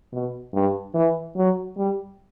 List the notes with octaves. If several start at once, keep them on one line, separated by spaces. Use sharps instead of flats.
B2
G2
E3
F#3
G3